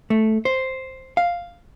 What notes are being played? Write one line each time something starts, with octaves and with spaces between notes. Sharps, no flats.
A3
C5
F5